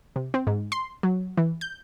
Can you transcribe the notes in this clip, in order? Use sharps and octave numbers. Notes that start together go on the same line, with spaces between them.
C3
C4
G#2
C6
F#3
E3
G6